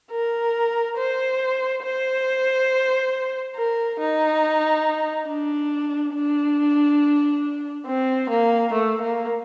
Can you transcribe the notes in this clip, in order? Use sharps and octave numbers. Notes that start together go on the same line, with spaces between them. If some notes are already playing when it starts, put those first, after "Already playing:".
A#4
C5
C5
A#4
D#4
D4
D4
C4
A#3
A3
A#3